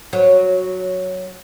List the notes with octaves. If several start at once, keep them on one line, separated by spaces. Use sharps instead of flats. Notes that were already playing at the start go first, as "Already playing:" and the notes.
F#3